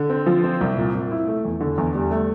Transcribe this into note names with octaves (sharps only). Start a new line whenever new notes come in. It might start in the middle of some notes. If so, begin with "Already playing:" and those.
Already playing: D3
C4
F3
C4
C2
A#2
A#2
E4
A3
E2
D3
E2
G3
A3